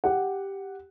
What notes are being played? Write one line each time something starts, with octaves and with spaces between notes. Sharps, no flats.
G4 F#5